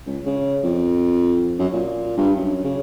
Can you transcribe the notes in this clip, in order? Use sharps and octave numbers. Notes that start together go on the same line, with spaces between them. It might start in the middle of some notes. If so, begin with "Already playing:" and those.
C#2
C#3
F2
F#2
A#2
G2
F#2
C#3